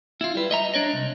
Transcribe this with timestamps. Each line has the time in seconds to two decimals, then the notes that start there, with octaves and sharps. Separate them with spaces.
0.21 E4 F4
0.35 G3 B4
0.51 D#5 E5 A#5
0.74 D4 C#5 D#5
0.93 C2